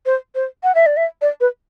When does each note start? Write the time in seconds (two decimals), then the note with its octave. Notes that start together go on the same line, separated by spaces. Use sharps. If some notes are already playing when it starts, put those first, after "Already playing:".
0.06 C5
0.35 C5
0.63 F#5
0.75 E5
0.86 D5
0.97 E5
1.22 D5
1.41 B4